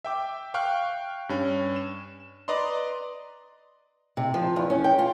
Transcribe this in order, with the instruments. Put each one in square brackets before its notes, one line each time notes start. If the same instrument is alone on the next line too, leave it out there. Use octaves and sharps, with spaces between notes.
[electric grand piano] E5 G5 D6
F5 G5 C#6 F6 F#6
G2 C#4
E7
B4 D5 D#5 A#5 C6
[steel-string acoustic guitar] C3
F3
E2
C#4
G5
F4